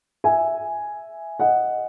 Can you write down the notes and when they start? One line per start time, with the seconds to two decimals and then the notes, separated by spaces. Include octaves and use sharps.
0.24 E5 G#5
1.39 D#5 F#5